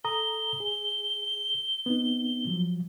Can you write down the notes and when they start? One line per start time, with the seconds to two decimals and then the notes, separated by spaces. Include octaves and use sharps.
0.04 A4 A#5 D#6 G7
0.60 G#4
1.86 B3 C4 D#4
2.47 F3 F#3